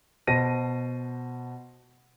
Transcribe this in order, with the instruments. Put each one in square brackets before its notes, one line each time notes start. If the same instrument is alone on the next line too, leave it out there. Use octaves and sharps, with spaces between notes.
[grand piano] B2 C5 A5 A#6 D#7